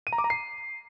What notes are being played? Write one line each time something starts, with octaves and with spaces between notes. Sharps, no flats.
D#7
A#5
D6
A#5
C7